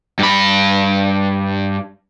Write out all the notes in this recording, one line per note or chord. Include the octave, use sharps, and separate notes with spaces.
G2 B5